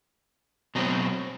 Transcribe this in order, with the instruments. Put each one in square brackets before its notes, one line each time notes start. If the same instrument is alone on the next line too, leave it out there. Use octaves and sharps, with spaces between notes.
[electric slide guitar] B2 F#3 A3 C4